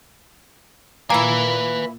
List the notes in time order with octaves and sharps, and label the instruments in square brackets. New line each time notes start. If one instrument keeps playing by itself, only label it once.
[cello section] A#2 [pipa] A#3 E4 [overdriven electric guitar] B4 G#5